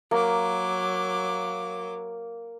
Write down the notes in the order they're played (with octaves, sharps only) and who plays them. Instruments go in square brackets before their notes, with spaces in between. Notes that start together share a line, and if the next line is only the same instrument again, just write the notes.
[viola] F#3 D6 [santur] A#3